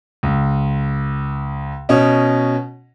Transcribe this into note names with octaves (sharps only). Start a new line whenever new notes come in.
C#2
B2 C#4 D#5